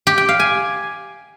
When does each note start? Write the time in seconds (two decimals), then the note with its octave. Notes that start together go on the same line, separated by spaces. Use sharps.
0.07 G4
0.18 G5
0.29 F5
0.40 G#5